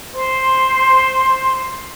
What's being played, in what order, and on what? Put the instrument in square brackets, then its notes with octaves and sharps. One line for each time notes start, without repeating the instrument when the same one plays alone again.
[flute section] C5 C6